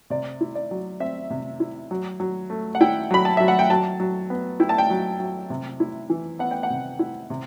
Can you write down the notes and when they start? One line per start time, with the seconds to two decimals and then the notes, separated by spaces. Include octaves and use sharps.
0.10 C3 D5
0.41 E4
0.55 D5
0.71 F#3
1.00 C4 E5
1.30 C3
1.60 E4
1.91 F#3
2.20 F#3
2.50 A3
2.75 F#5
2.81 E4 G5
3.11 F#3 B5
3.25 A5
3.37 F#3 E5
3.48 F#5
3.59 G5
3.70 F#3 A5
4.00 F#3
4.30 B3
4.60 E4 G5
4.69 A5
4.78 G5
4.90 F#3
5.20 F#3
5.50 C3
5.80 E4
6.10 E3
6.39 B3 F#5
6.51 G5
6.63 F#5
6.70 C3
6.99 E4
7.30 C3